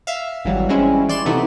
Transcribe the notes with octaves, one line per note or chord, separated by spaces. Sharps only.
E5 F5
G#1 E3 F#3 G3
G3 G#3 C4 C#4 E4
E3 D5 C6 E7
C3 E3 A3 B3 D#4 E4